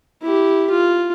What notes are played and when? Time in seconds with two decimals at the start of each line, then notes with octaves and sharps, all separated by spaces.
0.22 E4 G4
0.70 F4